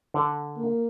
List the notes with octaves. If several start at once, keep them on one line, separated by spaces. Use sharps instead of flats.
D3
A#3